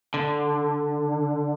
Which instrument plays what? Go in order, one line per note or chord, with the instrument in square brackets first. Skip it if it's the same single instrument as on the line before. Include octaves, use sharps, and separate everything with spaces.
[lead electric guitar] D3